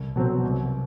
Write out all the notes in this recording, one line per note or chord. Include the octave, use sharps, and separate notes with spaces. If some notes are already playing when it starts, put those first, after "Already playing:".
Already playing: C2
B2 F#3 C4
C2